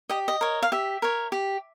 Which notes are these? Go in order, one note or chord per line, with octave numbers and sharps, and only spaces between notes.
G4 D#5
D#5
A#4 C#5
F5
G4 E5
A#4 C#5
G4